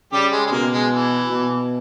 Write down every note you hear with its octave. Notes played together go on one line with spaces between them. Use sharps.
C#3 G3 G4
G#3
G#3
B2 A#3
G#3
E3
B2